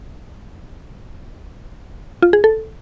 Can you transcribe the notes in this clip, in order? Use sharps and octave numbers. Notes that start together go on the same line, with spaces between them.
F4
G#4
A4